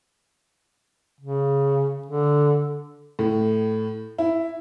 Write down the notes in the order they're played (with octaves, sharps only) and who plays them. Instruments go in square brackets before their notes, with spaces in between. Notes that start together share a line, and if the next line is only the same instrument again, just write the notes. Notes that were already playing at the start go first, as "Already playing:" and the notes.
[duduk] C#3
D3
[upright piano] A2
E4